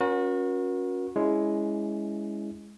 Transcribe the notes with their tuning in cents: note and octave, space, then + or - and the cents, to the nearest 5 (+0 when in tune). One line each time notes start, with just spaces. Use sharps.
C#4 +0 F#4 -25 A#4 +35
G#3 +0 C#4 +20 E4 +0